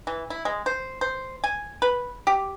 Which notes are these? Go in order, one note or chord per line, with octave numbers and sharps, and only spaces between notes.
E3
E4
G#3
C5
C5
G#5
B4
G4